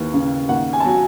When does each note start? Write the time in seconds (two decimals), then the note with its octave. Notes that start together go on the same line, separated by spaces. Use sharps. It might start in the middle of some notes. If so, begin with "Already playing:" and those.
Already playing: D#2 E3
0.14 C#3
0.49 D#2 F#5
0.73 G#5
0.80 A5
0.85 F#3 G#5